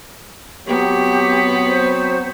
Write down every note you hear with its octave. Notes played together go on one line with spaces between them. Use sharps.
F#3 B3 C4 G4 C#5
C5